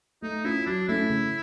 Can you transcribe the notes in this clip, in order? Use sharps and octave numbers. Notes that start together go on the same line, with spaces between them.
A3 D#4
C#4 E4 F4
F#3 D4
A3 C#4 E4
C#3